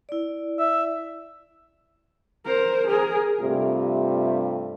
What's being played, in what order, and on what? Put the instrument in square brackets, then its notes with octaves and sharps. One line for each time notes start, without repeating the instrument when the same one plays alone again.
[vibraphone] E4 D5
[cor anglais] E5
[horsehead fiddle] A#4 C5
G#4 A#4
[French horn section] G2 C3 G3 A3 F4